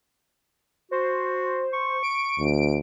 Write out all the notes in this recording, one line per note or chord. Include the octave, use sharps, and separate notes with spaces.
F#4 C5
C#6
D7
D2